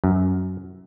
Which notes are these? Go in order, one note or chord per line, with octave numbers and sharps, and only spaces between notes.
F#2